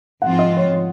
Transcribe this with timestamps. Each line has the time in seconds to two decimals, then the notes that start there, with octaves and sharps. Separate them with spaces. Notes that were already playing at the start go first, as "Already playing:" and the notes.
0.22 G#2 F3 C4 F4 F#5
0.39 D#5
0.57 C#5